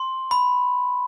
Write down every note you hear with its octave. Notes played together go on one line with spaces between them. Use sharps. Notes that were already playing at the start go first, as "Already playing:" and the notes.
Already playing: C6
B5